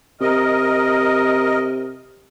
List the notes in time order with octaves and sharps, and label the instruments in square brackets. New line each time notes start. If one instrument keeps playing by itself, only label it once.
[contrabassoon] C3 [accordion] A#4 D#5